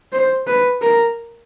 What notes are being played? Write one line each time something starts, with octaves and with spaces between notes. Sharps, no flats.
C5
B4
A#4